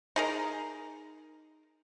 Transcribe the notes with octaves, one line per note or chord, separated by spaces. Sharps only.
D#4 G#4 A#4